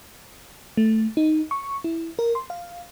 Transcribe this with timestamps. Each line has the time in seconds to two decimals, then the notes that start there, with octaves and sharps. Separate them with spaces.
0.77 A3
1.17 D#4
1.51 C#6
1.84 E4
2.19 A#4
2.35 C6
2.50 F5